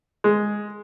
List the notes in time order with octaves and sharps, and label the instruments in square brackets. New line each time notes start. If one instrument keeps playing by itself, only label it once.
[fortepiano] G#3